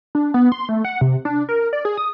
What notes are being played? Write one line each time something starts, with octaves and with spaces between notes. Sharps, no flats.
D4
B3
C6
A3
F#5
C3
D4
A#4
D5
G#4
D#6